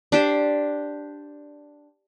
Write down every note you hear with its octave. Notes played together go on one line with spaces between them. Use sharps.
D4 G4 C5